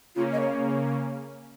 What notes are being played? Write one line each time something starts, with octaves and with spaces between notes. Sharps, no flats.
C#3 A#3 C#4 F4
D#5
C#5